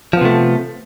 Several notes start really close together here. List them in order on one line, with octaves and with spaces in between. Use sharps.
F3 B3 C3 A3